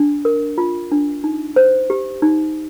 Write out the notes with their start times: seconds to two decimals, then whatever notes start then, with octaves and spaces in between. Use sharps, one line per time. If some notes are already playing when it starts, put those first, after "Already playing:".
Already playing: D4
0.25 A#4
0.58 F4
0.92 D4
1.24 D#4
1.56 C5
1.90 G4
2.22 D#4